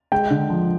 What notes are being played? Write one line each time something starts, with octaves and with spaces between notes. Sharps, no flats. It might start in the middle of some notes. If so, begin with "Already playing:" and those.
G#3 G5
D3
F3